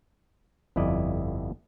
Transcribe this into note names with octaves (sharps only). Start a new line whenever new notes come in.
G1 F2 E4 D5 D#5